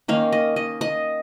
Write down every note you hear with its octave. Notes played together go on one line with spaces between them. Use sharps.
D#3 A#3 C#4 F5
D#5
D#5
D#5